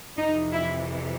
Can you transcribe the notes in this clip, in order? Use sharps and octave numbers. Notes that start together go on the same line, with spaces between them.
F2 C3 E3 D#4
E4